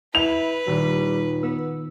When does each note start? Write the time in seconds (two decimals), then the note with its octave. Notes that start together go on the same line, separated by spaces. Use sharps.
0.15 E4 B4 F7
0.67 D#1 G3 D#4
1.43 B3 E6